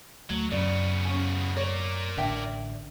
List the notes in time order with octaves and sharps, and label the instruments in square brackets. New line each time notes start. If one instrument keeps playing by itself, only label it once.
[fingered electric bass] D2 A3 [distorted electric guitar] F#3
[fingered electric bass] F#2 F#3 [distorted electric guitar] C#3 B3 [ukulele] D5
[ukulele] C#4 G#5
[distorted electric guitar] A#4 D5 [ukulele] C#5
[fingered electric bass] A1 D3 [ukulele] D4 E5 G5